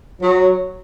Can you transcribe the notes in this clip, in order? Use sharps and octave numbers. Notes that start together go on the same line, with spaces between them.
F#3